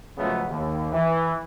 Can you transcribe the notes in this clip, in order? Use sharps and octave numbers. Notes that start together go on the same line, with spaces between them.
C#3 F3 F#3 G#3 A3 B3
D#2
E3